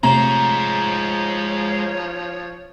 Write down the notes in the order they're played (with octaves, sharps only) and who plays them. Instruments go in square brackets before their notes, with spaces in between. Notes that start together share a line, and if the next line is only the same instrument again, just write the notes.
[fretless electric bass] C3 A3 C4 [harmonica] F3 C#5 [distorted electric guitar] G#3 C5 [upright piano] A#5